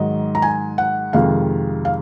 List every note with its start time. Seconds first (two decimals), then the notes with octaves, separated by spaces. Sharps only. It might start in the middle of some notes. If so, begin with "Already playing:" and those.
Already playing: G#2 D#3 F#3 D#5
0.35 A#5
0.42 G#5
0.78 F#5
1.13 F2 C3 D#3 G#3 F5
1.85 F5